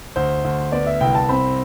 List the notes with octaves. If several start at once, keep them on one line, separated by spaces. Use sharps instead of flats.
D2 C5
D2
B3 D5
E5
C2 G5
A5
C4 B5